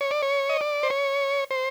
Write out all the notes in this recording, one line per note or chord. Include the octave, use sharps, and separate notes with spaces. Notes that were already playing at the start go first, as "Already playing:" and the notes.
C#5
D5
C#5
D#5
D5
C5
C#5
C5